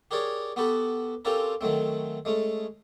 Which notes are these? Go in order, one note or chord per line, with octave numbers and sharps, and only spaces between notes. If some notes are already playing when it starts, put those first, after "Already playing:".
G4 G#4 A#4 C#5 D5
B3 F#4 G4 A4 B4
C4 C#4 F4 G4 A4 A#4
D#3 F#3 A3 C4
G#3 A3 C#4